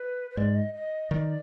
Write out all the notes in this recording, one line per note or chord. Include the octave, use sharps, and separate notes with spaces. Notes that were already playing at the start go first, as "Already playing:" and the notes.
Already playing: B4
B4
G#2 D5
D#5
D#5
D#3 D5